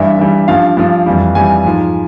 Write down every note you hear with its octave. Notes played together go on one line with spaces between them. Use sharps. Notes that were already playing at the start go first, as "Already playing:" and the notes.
Already playing: G2 E3 G3 E5
G2 E3 G3
G2 F3 F5
G2 F3
F2 E3 G3
F2 E3 G3 G#5
G#2 F3